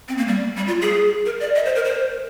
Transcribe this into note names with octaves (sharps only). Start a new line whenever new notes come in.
C4
A#3
G3
G3
F4
G#4
A#4
D5
D#5
C5
A#4
C5